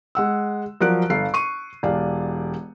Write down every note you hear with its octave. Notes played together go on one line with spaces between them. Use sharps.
G#3 F#5 E6
F3 F#3 A#4 D5 F#6 D7
G1 A4 F5 C7
C#6 D#7
E1 G4 D5 F5 A5